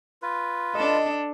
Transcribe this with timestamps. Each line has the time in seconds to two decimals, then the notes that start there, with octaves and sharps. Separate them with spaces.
0.22 F4 B4
0.75 D4 A4 D#5